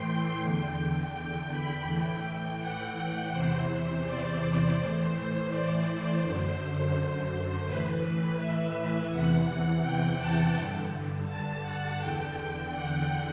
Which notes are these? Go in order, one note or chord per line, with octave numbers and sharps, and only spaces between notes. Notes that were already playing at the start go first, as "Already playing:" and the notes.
Already playing: A2 E3 G5 C6
E2 D3
G5
B5
A2 E3 G5
F#5
E2 C3 E3 C5
D5
A2 E3 C5
D5
C5
F#2 D3
A2 E3 B4
E5
E2 C3 E3 F#5
G5
A5
G2 D3
A5
F#5
E2 D3 G5
F#5